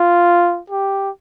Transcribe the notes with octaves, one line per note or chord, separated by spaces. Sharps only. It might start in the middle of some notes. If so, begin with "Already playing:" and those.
Already playing: F4
G4